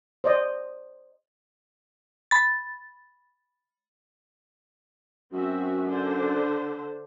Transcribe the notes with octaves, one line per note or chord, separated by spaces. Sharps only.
C5 D5 D#5
B5 A6
F#2 C4 F#4 E5
D3 D4 C5